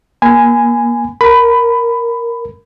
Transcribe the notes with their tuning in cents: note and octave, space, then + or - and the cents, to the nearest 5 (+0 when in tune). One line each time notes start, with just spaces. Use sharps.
A#3 +30 G#5 +0 B5 +35
A#4 +0 B5 +15